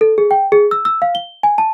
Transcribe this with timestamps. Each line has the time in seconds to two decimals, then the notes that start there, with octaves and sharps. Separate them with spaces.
0.01 A4
0.18 G#4
0.31 G5
0.52 G#4
0.71 E6
0.85 E6
1.02 F5
1.15 G7
1.43 G#5
1.58 A5